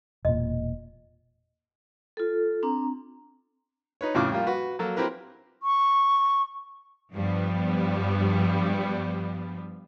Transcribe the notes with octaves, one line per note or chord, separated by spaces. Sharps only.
E1 A#2 D#5
F4 A4
C4 D4 A#5
D#4 B4 C#5
F2 A2 C#3 D6 F6
G3 A#3 F4
F#4 B4
F#3 A#3 A4
C4 E4 G4 A#4 B4
C#6
G2 F3 G3 B3